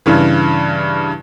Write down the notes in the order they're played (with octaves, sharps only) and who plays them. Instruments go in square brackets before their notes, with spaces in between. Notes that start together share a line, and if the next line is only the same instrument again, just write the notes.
[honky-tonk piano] G2 C#3 E3